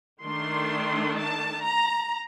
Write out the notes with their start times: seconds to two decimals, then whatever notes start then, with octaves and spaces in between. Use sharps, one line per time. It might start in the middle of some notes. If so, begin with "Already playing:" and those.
0.23 D#3 A3 D4 C6
1.16 A5
1.62 A#5